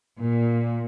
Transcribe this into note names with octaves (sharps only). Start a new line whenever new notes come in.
A#2